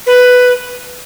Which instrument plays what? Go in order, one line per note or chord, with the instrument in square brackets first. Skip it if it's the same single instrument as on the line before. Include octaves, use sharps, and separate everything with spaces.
[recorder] B4